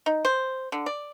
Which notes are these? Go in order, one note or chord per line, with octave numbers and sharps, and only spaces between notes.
D#4
C5
D3
D5